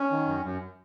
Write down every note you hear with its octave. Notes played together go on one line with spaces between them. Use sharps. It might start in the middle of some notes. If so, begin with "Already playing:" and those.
Already playing: C#4
D#3
F#2
F#2